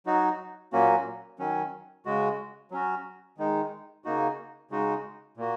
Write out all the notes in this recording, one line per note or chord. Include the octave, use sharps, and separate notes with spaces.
F#3 D#4 F#4
A#2 F#3 A#3 C#4 F#4
D#3 F#3 C#4
C#3 G#3 F#4
F#3 C#4 F#4
D#3 G#3 D#4
C#3 A#3 D#4 F#4
C#3 G#3 D#4 F#4
A#2 A#3 F#4